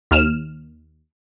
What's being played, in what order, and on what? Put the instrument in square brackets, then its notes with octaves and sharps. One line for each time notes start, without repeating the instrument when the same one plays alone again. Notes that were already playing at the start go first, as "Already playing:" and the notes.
[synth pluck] D#2 F6 E7